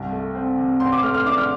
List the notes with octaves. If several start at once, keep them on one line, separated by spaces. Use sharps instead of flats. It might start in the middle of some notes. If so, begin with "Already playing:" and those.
Already playing: C2 G2
A3
C4
C3
A1 C6
D6
A3 F6
F6
D4 D6
F6